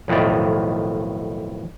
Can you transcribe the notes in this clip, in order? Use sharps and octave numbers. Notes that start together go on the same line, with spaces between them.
B1 F2 A2 D#3 D5